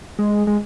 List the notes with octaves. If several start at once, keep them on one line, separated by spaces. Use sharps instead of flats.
G#3
G#3